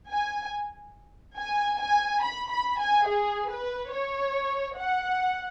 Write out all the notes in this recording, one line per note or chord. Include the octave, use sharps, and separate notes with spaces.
G#5
G#5
G#5
B5
B5
G#5
G#4
B4
C#5
F#5